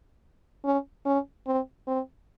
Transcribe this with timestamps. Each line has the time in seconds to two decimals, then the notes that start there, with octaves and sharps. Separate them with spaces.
0.65 C#4
1.06 C#4
1.47 C4
1.87 C4